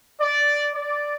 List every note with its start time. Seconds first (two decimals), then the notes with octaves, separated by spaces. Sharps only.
0.20 D5
0.73 D5